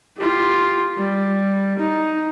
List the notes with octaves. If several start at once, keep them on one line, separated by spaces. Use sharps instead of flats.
F4 G4
G3
D#4